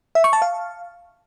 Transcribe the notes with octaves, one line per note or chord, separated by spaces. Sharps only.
E5
C#6
A5
F5